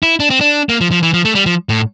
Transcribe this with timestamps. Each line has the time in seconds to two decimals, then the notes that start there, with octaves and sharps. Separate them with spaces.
0.03 E4
0.20 D4
0.30 C4
0.41 D4
0.69 A#3
0.81 F3
0.91 F3
1.02 E3
1.14 F3
1.25 A3
1.35 G3
1.46 F3
1.69 A2